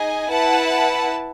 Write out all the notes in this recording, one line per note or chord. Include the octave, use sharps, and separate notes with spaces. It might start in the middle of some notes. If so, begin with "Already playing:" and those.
Already playing: D#4 G#4 D#5 G#5
E4 B4 F#5 A5